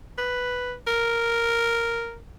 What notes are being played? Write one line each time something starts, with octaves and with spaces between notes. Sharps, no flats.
B4
A#4